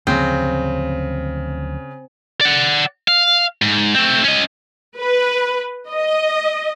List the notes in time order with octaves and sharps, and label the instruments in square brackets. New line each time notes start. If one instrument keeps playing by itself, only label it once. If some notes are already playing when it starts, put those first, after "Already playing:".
[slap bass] D2 F3 F#3 [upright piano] C#3 [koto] C4
[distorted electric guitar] D5 F#5
F5
G#2
A3 C4
C#4 D#5
[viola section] B4
D#5